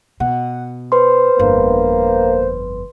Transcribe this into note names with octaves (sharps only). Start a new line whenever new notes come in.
B2 F#5
B4 C5 C6
G1 F2 A#3